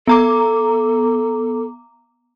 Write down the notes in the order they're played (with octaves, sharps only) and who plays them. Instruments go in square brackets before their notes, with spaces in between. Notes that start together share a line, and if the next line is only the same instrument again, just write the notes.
[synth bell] B3 A#5 D6 [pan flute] A4